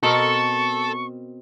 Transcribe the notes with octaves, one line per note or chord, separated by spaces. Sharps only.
B2 C4 A4 A#4 C#6